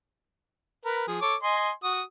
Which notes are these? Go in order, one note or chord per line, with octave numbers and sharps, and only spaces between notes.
A#4 B4
F3 G#4
A4 C#5 D6
D#5 G#5 C6
F#4 D#6